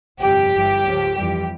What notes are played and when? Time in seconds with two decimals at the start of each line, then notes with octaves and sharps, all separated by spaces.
0.20 G1 F2 C3 G3 G4
0.52 G1 G2 E3 G3
0.83 C#2 C#3 F3
1.15 F2 E3 G3 G4